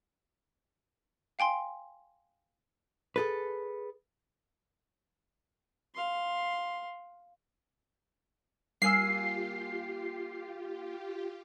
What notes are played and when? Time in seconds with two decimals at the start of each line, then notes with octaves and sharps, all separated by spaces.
1.39 F5 G5 G#5 C6
3.16 G#4 A4 B4
5.95 F5 C6
8.82 G3 A#3 F4 G4 G#5 E6 C7